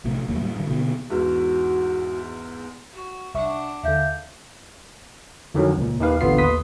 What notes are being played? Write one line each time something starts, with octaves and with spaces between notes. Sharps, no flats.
A#1 A2 C3 A3
D#2 F#3 A#3
A2 G3
G2 D#3
B2 D3 D#3 B3
E2 G#2 E3 F#4
F#4
C2 D4 E5 F#5 C#6
D#2 D3 E5 F5 G6
F2 D3 D#3 F3 F#3 C#4
C#2 A#2
D#2 D#3 D#4 G4 B4 F5
A1 D3 B3 F4 C7
D#2 B4 C6 D#6 B6